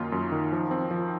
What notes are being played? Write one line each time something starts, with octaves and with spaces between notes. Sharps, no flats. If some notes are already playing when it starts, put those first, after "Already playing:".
Already playing: F#2 D#3 A#3 F4
F#2
D#3
F3
C4
F3